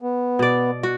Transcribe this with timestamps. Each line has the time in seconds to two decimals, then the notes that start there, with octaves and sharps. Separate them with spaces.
0.02 B3
0.39 B2 D5
0.83 F#4